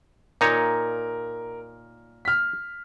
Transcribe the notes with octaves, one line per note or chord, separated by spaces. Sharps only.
A#2 D#4 A#4 C#5
F6 B6